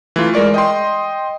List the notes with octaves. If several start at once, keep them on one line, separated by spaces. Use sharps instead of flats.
E3 A3 F4
G#3 A#4 D5 C#6
D#5 G5 C6